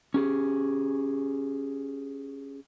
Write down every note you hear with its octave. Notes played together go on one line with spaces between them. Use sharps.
C#4 G4 G#4